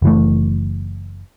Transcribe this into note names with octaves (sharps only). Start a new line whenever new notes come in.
F#1 E3 A3